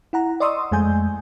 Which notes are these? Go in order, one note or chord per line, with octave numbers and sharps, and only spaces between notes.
E4 F#5 A#5
D5 D#5 C6 C#6 D#6 E6
F2 G#3 A3 G#5 G6